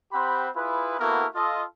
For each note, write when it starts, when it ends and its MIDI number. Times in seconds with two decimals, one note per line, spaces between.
0.12 0.49 60
0.12 0.49 67
0.12 0.49 72
0.12 0.49 78
0.12 0.49 83
0.56 0.97 64
0.56 0.97 65
0.56 0.97 68
0.56 0.97 71
1.00 1.26 58
1.00 1.26 59
1.00 1.26 64
1.00 1.26 66
1.00 1.26 69
1.00 1.26 70
1.35 1.63 65
1.35 1.63 69
1.35 1.63 75